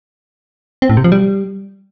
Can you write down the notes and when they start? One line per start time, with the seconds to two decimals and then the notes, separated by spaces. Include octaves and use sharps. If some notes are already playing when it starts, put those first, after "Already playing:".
0.82 C4
0.90 A2
0.97 C3
1.04 F3
1.12 G3